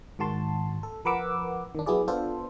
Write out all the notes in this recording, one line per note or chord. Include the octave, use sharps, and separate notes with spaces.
G#2 D#3 F#4 A5 C6
A4
F3 A#4 B4 F#5 D6 E6
D#3 D4
F#3 B3 E4 G#4 D5
B3 D4 F4 A4 C5